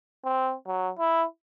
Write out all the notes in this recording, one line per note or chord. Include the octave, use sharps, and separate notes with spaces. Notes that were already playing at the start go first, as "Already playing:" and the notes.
C4
F#3
E4